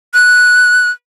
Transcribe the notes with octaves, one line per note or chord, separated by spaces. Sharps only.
F#6